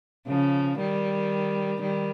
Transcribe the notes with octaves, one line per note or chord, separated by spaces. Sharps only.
C#3 F3
D#3 G3
D#3 G3